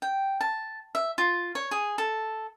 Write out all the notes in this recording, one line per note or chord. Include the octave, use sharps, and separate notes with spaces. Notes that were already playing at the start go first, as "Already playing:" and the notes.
G5
A5
E5
F4
C#5
G#4
A4